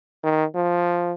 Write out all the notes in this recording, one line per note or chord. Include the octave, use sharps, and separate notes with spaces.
D#3
F3